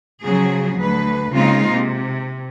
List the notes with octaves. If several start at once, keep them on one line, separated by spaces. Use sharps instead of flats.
C#3 F3 F#3 G#4
D2 B4
C#3 G#3 A#3 C4 D#4 F4
C3